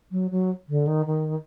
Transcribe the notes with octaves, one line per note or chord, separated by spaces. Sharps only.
F#3
F#3
D3
D#3
D#3